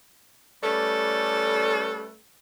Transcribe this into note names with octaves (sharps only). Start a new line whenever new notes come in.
G3 A3 C#4 A4 B4 D5